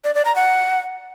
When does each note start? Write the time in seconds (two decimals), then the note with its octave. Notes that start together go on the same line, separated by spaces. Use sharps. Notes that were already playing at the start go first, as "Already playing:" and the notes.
0.04 D5
0.15 D5
0.25 A#5
0.36 F#5